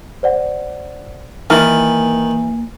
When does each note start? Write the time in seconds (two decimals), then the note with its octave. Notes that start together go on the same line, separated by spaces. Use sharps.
0.23 C5 D5 F#5
1.50 D#3 E3 A#3 F6 A6